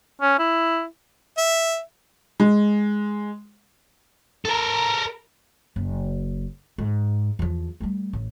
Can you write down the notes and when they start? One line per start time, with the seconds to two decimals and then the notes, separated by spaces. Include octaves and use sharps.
0.21 C#4
0.39 E4
1.38 E5
2.40 G#3
4.45 A4 A#4
5.76 F#1
6.78 G#2
7.39 E2 F3
7.80 G3 A3
8.13 A1